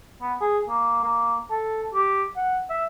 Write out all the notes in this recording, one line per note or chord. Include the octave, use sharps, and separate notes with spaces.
B3
G#4
A#3
A#3
A4
G4
F#5
E5